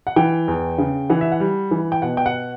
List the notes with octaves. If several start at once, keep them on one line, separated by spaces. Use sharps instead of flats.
F#5
E3 G5
E2
C#3
E3 F#5
E5
F#5
G3
E3
G5
B2 F#5
G5
F#5